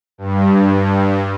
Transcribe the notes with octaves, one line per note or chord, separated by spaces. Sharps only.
G2